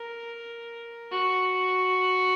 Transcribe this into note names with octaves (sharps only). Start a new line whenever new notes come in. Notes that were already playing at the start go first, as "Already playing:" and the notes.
Already playing: A#4
F#4